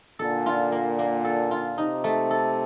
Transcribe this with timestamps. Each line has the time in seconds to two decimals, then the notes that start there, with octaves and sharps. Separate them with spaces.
0.19 A#2 D3 A4
0.46 F4
0.72 A#3
0.99 A#3
1.25 A4
1.51 F4
1.78 C3 D#4
2.04 A3
2.31 A4